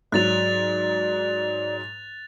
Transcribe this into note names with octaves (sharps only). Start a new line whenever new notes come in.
G#2 F#3 D5 F#6 A6 F7